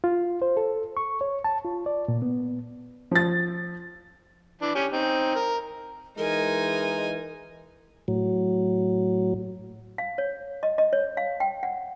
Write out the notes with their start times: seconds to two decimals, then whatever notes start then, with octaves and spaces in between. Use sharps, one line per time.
0.04 F4
0.42 C5
0.57 A4
0.97 C#6
1.21 C#5
1.44 A5
1.65 F4
1.86 D5
2.08 A#2
2.22 B3
3.11 F3 A6
4.62 E3 D4
4.75 C#4 G4
4.92 C4 D#4
5.35 A#4
6.18 E3 G#3 D#4 A#4 G#5
8.08 A2 F#3
9.98 F5
10.18 C#5
10.63 D#5
10.78 D#5
10.93 C#5
11.17 F5
11.40 G5
11.63 F#5